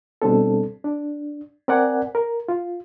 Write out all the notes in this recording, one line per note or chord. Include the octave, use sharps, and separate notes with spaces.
B2 G3 C4 D4 A4
D4
C4 A#4 D5 F#5 G#5
A#4
F4